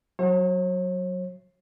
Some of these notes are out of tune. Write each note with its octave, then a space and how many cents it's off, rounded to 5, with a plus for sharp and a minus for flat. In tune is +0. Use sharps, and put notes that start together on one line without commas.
F#3 +0 C#5 -40 E5 +15